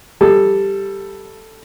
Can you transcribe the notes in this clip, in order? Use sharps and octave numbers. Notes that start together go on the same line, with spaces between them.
G3 A4